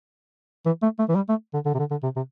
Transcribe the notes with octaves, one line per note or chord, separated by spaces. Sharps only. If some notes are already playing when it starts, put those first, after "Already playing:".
E3
A3
A3
E3
G3
A3
D3
D3
C3
D3
D3
C3
C3